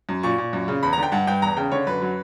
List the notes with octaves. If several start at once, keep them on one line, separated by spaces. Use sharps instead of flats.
F#2
A#2 C#6
A#2
F#2
C#3
E2 B5
A#5
D3
G5
G2 F#5
G2 G5
E2 A#5
C#3 G5
D3 C#5
F#2 B4
F#3